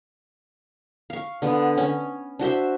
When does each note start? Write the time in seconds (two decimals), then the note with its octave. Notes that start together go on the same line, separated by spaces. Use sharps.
1.10 F5 C#6
1.42 D3 B3
1.78 C#4
2.39 D4 F#4 C5 E5